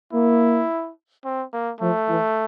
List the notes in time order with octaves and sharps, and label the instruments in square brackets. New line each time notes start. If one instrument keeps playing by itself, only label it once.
[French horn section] A#3 [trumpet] E4
[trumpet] C4
A#3
[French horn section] F3 [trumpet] A3
[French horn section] E3